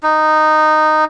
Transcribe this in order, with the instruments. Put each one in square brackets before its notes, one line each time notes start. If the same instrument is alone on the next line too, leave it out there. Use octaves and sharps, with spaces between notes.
[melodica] D#4